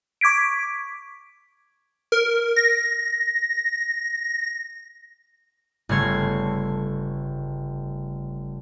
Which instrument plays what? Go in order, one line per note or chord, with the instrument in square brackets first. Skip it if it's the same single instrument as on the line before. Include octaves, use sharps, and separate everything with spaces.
[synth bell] C#6 D6 G#6 B6 D7
[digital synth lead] A#4
A#6
[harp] G1 C#3 A3 C#5 C6 G#6